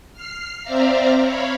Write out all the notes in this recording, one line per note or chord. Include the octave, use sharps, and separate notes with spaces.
F6 C7
C4 C5 D5 E5 F5 A#5
C#5 F5 B5